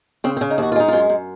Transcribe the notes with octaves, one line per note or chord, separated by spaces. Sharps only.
C#3 C4
C4
C#3
D#4
D#2 F#4
F4
G#3 D#4
F#2 F4
F#2